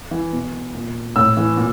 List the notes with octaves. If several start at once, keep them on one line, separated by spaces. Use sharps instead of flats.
E3
B2
A#2
A2 E6
E3
A#2